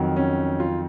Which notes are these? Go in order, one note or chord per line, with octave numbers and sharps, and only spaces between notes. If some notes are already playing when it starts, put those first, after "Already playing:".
Already playing: F2 D#3 F#3
C#4
F4